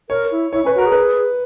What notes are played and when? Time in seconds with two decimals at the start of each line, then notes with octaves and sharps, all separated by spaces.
0.09 A#4 C#5
0.31 E4
0.52 E4 C#5
0.63 C#4
0.66 B4
0.75 F#4
0.78 A#4
0.85 G#4
0.92 B4